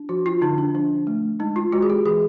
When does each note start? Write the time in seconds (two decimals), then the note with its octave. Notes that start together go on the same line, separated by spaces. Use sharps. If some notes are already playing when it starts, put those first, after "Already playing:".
Already playing: D4
0.09 F3 F#4
0.26 F4
0.41 D3 D#4
0.58 D4
0.74 F3 D4
1.07 A3
1.40 G#3 D#4
1.56 F4
1.72 G#3 F#4
1.82 G#4
1.90 G4
2.05 E3 G#4